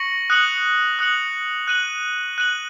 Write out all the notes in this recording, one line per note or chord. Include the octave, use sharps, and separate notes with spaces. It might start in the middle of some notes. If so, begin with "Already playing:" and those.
Already playing: C#6 A#6 C#7 F#7
D#6 F#6 C#7 F#7
D#6 F#6 C#7 F#7
F#6 D#7 F#7
F#6 D#7 F#7